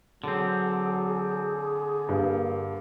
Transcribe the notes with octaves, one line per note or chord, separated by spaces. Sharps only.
D3 F#3 C4 G#4
G2 A#3